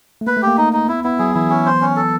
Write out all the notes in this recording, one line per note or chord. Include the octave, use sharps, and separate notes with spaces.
A3
A#3 B4
A3
A#3 G4
D#4
D#4
B3 E4
B3 E4
F#3 G#4
E3 E4
C#4
C5
C#4
A4